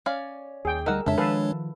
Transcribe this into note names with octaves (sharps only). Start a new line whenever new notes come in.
C#4 D5 F5
D#2 G#4 G5
D2 G3 D#4 A#4 F#5 E6
F2 C#3 G#3 D4 A4 C#5 E5
D#3 F3 G#4 A4 B4 F5